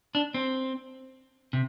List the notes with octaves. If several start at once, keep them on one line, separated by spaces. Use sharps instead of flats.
D4
C4
C3